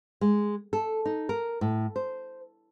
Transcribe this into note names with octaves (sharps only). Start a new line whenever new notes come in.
G#3
A4
D#4
A#4
A2
C5